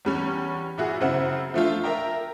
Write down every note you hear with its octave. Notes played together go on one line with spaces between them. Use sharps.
E2 G3 C#4
A#2 E4 F#4 G#4
F#2 C#3 C4 E4 F#5
F3 A3 D4 F4
A#4 E5 G5 A#5